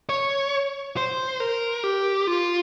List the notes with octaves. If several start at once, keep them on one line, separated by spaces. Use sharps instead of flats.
C#5
C5
A#4
G4
F4